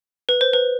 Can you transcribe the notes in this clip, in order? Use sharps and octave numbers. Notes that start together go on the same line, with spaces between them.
B4
C5
B4